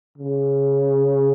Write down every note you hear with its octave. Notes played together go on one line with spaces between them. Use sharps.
C#3